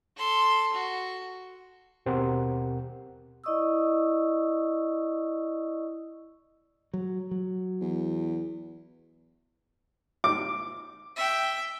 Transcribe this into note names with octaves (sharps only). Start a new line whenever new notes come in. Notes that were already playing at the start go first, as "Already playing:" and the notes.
A4 C6
F#4
D#2 B2 C4 G4 A#4 F#5
E4 D5 D#5 C#6 D#6 E6
F#3
F#3
E2
D6
E5 G5